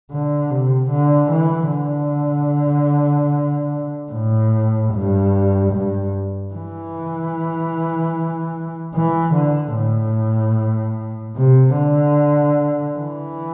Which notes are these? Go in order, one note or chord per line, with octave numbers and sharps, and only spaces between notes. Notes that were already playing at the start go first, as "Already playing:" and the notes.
D3
C3
D3
E3
D3
A2
G2
G2
E3
E3
D3
A2
C3
D3
E3